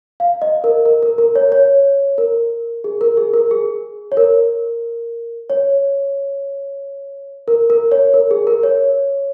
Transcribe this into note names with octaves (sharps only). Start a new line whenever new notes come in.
F5
D#5
A#4
A#4
A#4
A#4
C#5
C#5
A#4
G#4
A#4
G#4
A#4
G#4
C#5
A#4
C#5
A#4
A#4
C#5
A#4
G#4
A#4
C#5